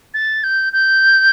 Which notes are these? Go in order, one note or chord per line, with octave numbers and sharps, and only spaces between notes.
A6
G6
G6